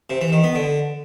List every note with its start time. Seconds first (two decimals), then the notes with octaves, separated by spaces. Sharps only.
0.10 C3
0.21 E3
0.32 D#3
0.44 B3
0.55 D3